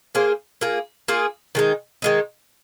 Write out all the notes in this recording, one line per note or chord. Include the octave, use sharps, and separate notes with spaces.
A#3 G#4 C5
A#3 F4 G#4
A#3 F4 G#4
D#3 G#3 D#4
D#3 G#3 D#4